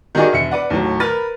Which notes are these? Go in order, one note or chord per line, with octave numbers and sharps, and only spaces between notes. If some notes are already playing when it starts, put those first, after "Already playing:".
D#3 G3 D#4 F#4 G#4 D5
E1 E5 C#7
B4 D5 F#5
D#2 A2 F#3
A#4 B4 B5 F6 A6